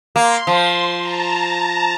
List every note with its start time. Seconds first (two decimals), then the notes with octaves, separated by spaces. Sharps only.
0.16 A#3 C6
0.47 F3
1.01 A5 A#5